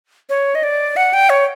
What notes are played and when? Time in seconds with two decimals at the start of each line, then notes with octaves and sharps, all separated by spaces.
0.29 C#5
0.55 D#5
0.63 D5
0.96 F#5
1.13 G5
1.30 C#5